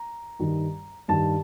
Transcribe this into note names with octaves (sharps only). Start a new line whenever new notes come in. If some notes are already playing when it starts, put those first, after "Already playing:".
Already playing: A#5
G2 D#3 G3
G2 D#3 G3 A5